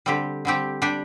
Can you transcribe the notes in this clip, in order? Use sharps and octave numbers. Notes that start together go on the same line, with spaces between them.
D3 G3 C4 G4
D3 G3 C4 G4
G3 D4 G4